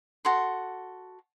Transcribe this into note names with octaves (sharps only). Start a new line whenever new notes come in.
F#4 A4 C6